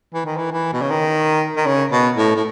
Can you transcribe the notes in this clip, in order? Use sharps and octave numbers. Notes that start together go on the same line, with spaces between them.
E3
D#3
E3
E3
B2
C#3
D#3
D#3
C#3
B2
A2
A2